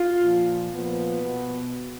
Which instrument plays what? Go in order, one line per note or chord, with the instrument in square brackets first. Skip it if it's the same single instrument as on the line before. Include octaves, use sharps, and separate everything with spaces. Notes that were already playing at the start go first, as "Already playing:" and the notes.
Already playing: [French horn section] F4
A#2 F3
A#2 F3 B3
B2